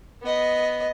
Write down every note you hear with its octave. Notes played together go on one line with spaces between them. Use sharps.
B3 D#5